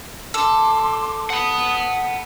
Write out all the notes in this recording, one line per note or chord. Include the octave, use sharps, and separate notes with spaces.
A4 C6 D6
F#5 B5 D#6